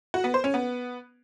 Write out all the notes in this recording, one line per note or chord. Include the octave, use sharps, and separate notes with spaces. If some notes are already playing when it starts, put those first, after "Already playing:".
F#4
B3
C5
C#4
B3